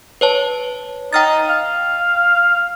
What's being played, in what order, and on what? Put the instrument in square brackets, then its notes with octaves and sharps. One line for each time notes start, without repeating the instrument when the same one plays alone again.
[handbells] B4 C#5 A5
[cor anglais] D#4 [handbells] G5 F6 A6
[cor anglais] F5